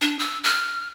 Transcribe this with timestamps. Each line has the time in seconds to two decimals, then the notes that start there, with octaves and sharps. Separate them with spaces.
0.01 D4
0.19 E6
0.44 F6